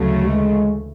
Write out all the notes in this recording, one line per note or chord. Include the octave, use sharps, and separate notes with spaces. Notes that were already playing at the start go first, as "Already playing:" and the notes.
Already playing: D2 C#3 E3 F#3 A3
G#3